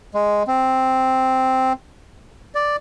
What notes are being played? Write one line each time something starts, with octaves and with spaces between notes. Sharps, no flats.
G#3
C4
D5